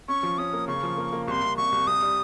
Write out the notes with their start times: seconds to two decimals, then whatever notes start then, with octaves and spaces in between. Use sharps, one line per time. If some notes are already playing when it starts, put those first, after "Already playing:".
0.08 C#4 C#6
0.23 F3
0.38 C#4 D#6
0.53 A#3
0.68 C#3 C#6
0.83 F3
0.98 A#3
1.13 A#3
1.27 C2 C6 C#6
1.42 C2
1.57 C2 C#6
1.72 C2
1.87 C2 D#6
2.02 G3